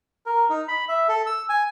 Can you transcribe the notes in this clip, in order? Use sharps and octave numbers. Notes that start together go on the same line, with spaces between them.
A#4
D#4
B5
E5
A4
E6
G#5